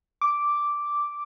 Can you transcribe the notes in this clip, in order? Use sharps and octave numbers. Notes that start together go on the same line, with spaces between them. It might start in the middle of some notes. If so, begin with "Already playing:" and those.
D6